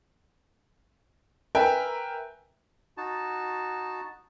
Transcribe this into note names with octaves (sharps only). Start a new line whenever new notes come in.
A#4 B4 E5 G5 G#5
D#4 F#4 A5